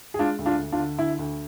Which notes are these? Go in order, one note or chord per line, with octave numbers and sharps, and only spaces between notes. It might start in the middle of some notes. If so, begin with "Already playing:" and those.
G#4
G#3 D4 F4
D2
D4 F4
D2
D4 F4
D3
D2 E4
D2